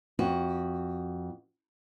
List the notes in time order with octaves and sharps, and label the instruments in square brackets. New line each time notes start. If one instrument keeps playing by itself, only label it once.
[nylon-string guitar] F2 F#4